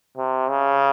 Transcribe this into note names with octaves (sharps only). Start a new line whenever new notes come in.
C3
C#3